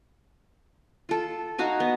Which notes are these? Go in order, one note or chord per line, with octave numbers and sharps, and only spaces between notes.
F4 A4
D#4 F#4 F5 G#5
B3